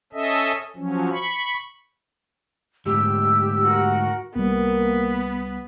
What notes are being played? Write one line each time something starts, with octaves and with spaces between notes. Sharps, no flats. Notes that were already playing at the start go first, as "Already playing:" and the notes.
C#4 A4 D#5 E5
F3 F#3 C#4
B5 C#6
D2 G#2 G4 E6
F#4 A#4
C2 G3 A#3 B3